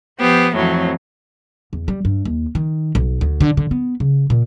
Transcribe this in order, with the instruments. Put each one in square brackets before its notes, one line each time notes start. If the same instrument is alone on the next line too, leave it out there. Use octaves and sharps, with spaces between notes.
[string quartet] F3 B3 G4 C5
F2 A2 E3 F#3 C4
[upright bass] E2
G3
G2
D#2
D#3
B1
D2
D3
D3
B3
C#3
A#2